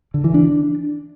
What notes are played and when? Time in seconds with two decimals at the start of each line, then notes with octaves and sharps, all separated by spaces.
0.14 D3
0.24 E3
0.34 D4